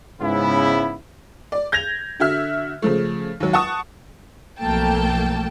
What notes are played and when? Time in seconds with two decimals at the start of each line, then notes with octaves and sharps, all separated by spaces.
0.21 G#2 C#3 B3 E4
1.52 D5
1.72 G6 G#6 A#6 F7
2.20 D3 F#4 E5 F6
2.82 C#3 F3 A3
3.40 D#2 F#3
3.53 F#5 A5 C#6 D#6
4.59 B1 F2 A3 A#3 G5 A5